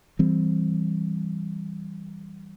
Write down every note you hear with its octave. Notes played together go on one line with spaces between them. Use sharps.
E3 G3 C4